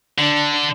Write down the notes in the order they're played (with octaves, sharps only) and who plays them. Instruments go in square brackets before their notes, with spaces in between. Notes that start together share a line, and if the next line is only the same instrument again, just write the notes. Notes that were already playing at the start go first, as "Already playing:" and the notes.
[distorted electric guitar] D3 [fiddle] D4